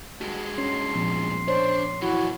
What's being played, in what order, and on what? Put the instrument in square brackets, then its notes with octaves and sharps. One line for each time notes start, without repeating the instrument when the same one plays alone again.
[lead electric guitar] G2 G#3 [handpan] F#4
[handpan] C#4 [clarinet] C6
[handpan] A#2 F3 B3
[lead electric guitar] D4 [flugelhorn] C5 [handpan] C#5
[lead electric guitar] E3 F#3 [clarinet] E4 [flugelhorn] F#4